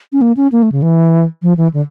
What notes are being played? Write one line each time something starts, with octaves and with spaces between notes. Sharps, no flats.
C#4
A#3
C#4
A#3
A3
C#3
E3
F3
E3
D3